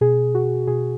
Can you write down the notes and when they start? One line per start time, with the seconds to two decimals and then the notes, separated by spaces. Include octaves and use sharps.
0.01 B2 G#4
0.35 F#4
0.67 B2 G#4